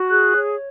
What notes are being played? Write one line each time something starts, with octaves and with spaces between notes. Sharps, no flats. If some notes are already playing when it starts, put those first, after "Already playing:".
Already playing: F#4
G#4 F#6
C#5